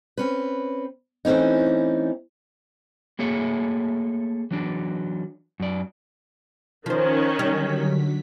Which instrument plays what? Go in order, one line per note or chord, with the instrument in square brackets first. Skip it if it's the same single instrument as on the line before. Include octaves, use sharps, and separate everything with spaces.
[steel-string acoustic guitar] C4 C#4 B4
E3 A3 C4 C#4 D#4
[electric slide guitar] A3 A#3 G#4 C#5 E5
E3 F#3 D4
F#2 D5
[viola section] D#3 C#4 [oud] F3 C5 [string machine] F#6
[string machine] D3 F#3 B6 [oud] G3